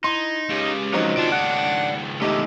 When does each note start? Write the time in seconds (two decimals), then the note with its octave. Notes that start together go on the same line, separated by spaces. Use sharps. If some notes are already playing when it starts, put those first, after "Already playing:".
0.04 D#4 E4 C6
0.49 C#2 C#3 G4
0.94 F3 F#3 C4 D#4 F#4
1.17 C#2 D#3 F4 D5 A5
1.32 F#5 F#6
2.22 E2 A3 D#4 G4